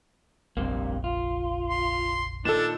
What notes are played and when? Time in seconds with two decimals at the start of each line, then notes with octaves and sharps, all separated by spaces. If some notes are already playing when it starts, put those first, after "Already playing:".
0.57 F1 A#1 G2 C3 A#3
1.04 F4
1.70 C6
2.45 A#2 D#3 D4 A4 E7